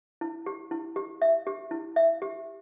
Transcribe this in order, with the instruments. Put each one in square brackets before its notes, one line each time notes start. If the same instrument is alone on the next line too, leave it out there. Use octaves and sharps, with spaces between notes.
[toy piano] E4
G4
E4
G4
E5
G4
E4
E5
G4